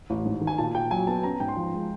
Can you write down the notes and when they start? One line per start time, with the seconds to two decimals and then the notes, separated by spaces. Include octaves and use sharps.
0.10 A1
0.26 G#2
0.41 D#3
0.47 G#5
0.58 A#2 A5
0.75 A#2 G5
0.91 F#3 G#5
1.07 B3 A5
1.23 C#4 A#5
1.40 G#2 G5
1.48 C6
1.56 F3
1.73 G#3